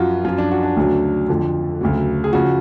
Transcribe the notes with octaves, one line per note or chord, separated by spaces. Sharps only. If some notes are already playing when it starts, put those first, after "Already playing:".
Already playing: F#2 F3 F4 F#4
F#2 F3 F4
D4
F#4
D4
D2 C#3 F#3
F2 D3 F3
D2 C#3 F#3
G#4
C#3 F3 F#4